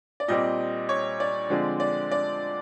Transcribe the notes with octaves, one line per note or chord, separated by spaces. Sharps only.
D5
A#2 G3 C4 D#5
C#5
D5
D3 F3 G#3 C4
D5
D5